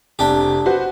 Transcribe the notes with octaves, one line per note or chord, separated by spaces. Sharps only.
F1 C3 D4 G4
F#4 B4 C5 F#5